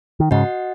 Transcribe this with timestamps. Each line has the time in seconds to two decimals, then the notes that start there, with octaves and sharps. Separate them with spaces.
0.20 D#3
0.31 G#2 C#3 F#4 D#5 F#5